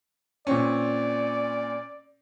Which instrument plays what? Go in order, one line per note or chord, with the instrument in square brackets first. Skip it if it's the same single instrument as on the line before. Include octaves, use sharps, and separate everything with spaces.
[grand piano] A#2 C4 C#4 [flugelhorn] D5